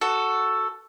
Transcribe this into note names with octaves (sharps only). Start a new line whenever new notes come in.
F#4 A4